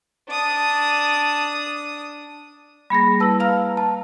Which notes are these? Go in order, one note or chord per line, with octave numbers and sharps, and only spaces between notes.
D4 D#6
G3 A#3 G#4 B5 A#6
E4 B4 A5 E6
F5 A#5 F6
A5